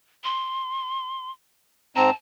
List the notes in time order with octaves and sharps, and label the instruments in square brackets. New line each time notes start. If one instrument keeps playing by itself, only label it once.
[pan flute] C6
[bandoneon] G#2 C4 A#5 [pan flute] A5